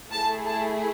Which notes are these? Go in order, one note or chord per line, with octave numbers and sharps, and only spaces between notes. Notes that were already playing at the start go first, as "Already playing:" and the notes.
A3 E4 G#4 A5
A5